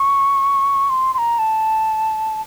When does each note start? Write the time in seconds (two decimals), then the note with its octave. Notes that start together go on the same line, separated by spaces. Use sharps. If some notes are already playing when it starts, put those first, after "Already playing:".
Already playing: C#6
0.89 C6
1.14 C6
1.18 A#5
1.39 A5